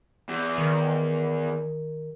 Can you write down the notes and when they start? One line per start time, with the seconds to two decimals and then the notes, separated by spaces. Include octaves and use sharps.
0.29 E2
0.58 D#3